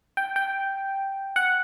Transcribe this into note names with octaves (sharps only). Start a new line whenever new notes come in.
G5
G5
F#5